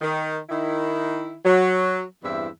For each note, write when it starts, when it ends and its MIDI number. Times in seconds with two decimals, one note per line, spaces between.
0.01 0.39 51
0.50 1.35 51
0.50 1.35 64
1.45 2.02 54
2.23 2.48 40
2.23 2.48 43
2.23 2.48 60
2.23 2.48 64
2.23 2.48 76